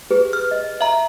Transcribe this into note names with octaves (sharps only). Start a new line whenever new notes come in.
G4 G#4 B4
F6
D#5
E5 A#5